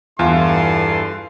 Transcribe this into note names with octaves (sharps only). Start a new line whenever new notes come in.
E2 G2 E4 F4 A4 C6